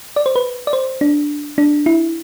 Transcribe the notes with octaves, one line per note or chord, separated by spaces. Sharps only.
D5
C5
B4
D5
C5
D4
D4
E4